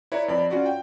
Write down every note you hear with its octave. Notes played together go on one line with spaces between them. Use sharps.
E4 B4 C#5 D5 A#5
F2 D5 B5
C#4 F4 F#4 D5
G5